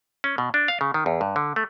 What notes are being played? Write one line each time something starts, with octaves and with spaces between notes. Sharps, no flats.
C#4
B2
D4
F5
C#3
D#3
E2
G2
D3
A3